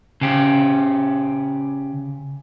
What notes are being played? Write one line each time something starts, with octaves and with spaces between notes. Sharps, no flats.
C#3 G4